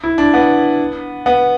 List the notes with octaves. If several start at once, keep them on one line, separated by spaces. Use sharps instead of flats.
E4
D4
B3
B3